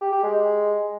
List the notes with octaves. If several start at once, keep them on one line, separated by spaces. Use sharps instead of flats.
G4
G4
G#3